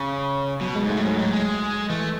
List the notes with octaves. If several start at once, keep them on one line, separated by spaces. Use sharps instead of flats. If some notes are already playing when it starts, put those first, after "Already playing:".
Already playing: C#3
B2 F#3
G#3
G#2
A3
A2
G#2 F#3
A2
G#3
E3 A3